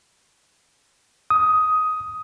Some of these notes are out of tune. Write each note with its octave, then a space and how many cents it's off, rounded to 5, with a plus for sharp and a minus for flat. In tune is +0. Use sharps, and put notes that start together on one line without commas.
D#6 +10